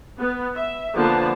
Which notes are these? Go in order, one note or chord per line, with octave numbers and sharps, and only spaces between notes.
B3
E5
D3 F3 A#3 B3 A5